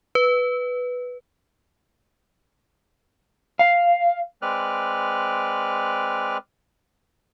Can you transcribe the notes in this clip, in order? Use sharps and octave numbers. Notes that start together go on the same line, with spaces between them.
B4
F5
G#3 C4 B4 D5 F6 F#6